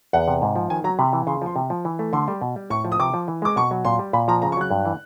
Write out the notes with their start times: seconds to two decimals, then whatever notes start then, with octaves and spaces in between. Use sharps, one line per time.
0.13 E2 F#5
0.28 C3
0.42 G#2
0.56 F3
0.70 D#3 G#5
0.84 F#3 A#5
0.99 C3 B5
1.13 E3
1.27 C#3 C6
1.42 F3 C6
1.56 C3
1.70 F3
1.85 E3
1.99 A3
2.13 D3 C6
2.28 G3
2.41 B2
2.56 G3
2.70 A2 C#6
2.85 F3
2.92 D#6
3.00 C3 D6
3.14 F3
3.28 E3
3.42 G#3 D6
3.56 B2 C#6
3.71 F#3
3.85 A#2 C6
3.99 G3
4.13 A#2 B5
4.28 F3 A#5
4.42 C#3 A#5
4.52 C#6
4.57 F#3 F#6
4.71 G2
4.85 E3